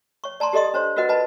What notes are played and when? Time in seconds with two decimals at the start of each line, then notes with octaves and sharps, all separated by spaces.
0.24 C#5 C#6
0.40 D5 A5 A#5 C6
0.53 G4 A4 D5 D#5 C6 D#6
0.74 D4 C5 C#5 C6
0.96 F4 F#4 A#4 B4 D#5 F#5
1.09 B4 D#5 A5 B5